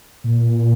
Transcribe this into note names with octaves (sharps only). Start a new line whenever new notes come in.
A#2